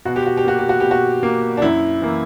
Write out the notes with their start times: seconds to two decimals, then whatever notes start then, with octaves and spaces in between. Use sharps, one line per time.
0.05 B2 F#4
0.16 G4
0.26 F#4
0.37 G4
0.45 A#3 F#4
0.59 G4
0.69 F#4
0.80 B2 G4
0.91 F#4
1.23 A#3
1.57 D4
1.62 F#2 E4
2.01 E3 A#3